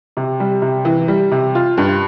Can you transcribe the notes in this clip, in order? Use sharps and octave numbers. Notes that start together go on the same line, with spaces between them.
C3
G3
C3
E3
G3
C3
F4
G2